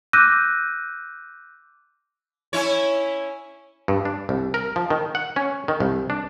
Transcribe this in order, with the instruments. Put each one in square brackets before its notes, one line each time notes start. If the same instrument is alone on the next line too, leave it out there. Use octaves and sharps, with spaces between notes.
[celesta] D6 E6 F#6 G6 A#6 D#7
[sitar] C#4 E4 C#5
[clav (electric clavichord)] G2
D4
C2
A#4
F3
D#3
F#5
C#4
D#3
C2
D4